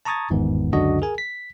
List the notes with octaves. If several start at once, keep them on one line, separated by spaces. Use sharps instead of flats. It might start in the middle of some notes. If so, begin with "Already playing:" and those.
A5 A#5 C#6 D#6 G#6 A6
G1 E2 G#2 D#3 B3
C#2 F#2 D3 D4 F#4 D#5
G#4 A#4 G#5
B6